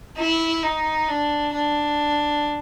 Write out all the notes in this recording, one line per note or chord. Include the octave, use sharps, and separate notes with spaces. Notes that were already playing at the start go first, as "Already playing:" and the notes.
E4
D#4
D4
D4